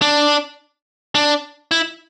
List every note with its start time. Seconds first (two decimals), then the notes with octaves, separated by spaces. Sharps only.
0.02 D4
1.15 D4
1.71 E4